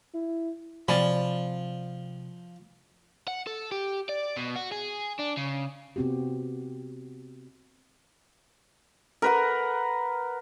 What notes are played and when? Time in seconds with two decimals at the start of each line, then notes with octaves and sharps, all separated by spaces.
0.14 E4
0.88 C3 F3 D5 G#5 B5
3.27 F#5
3.47 A4
3.72 G4
4.09 D5
4.37 B2
4.56 F#4
4.72 G#4
5.19 D4
5.37 C#3
5.96 C3 B3 C4 F#4 G4
9.22 A#4 B4 F#5